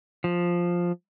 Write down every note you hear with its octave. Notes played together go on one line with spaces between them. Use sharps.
F3